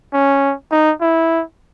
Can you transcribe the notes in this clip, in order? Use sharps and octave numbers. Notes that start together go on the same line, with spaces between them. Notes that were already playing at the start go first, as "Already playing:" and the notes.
C#4
D#4
E4